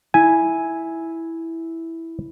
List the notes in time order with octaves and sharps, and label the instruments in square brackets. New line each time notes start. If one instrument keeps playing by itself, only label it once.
[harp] E4 [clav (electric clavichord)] G#5